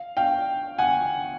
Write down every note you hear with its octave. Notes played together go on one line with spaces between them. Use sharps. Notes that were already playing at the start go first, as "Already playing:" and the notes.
Already playing: F5
F5 G5
F#5 G#5